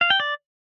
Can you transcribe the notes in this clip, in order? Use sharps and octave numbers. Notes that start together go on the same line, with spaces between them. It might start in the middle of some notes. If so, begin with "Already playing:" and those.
F5
G5
D5